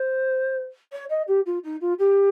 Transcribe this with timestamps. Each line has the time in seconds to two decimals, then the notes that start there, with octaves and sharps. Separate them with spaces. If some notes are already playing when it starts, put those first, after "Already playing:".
Already playing: C5
0.92 C#5
1.10 D#5
1.28 G4
1.46 F4
1.64 D#4
1.81 F4
1.99 G4